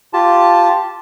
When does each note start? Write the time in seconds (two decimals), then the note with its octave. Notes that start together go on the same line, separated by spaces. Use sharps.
0.13 F4 G4 A5